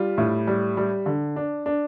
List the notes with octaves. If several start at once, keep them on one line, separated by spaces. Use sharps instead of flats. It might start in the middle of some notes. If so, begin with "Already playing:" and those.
Already playing: G3 F4
A2
G3
G3
D3
D4
D4